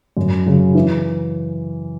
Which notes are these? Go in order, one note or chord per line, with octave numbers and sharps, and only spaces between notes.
F#2
C#3 F#3
E3